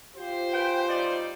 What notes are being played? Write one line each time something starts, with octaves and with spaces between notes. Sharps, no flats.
F4 G4 C5
G#4 B4 G5
G3 D#4 D5